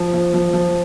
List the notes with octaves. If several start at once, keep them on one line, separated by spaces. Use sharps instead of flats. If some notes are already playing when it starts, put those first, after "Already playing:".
Already playing: F3
F3
F3
F3